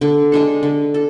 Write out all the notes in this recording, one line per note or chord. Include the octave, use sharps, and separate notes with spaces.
D3
G#3 D4 A4
D3
A4